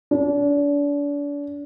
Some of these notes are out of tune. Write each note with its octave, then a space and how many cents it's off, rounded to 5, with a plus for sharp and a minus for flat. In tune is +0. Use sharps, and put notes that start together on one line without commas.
D4 -35